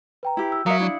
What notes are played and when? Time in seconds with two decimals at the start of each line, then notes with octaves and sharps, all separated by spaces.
0.23 B4 G5 A#5
0.37 E4 G4
0.52 E6
0.66 F#3 A#4 E5 F5 D#6 C#7
0.79 D4 E4